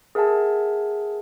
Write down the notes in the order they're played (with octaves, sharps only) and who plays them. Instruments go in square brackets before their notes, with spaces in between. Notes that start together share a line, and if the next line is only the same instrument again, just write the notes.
[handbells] G#4 A#4 E5 F#5 G#5 A5